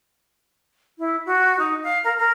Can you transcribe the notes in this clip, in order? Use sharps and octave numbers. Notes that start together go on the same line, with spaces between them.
E4
F#4
D#4
F5
A#4
A#4